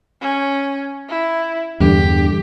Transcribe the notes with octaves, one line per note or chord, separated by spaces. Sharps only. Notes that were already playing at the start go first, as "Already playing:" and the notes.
C#4
E4
E2 G2 D3 G4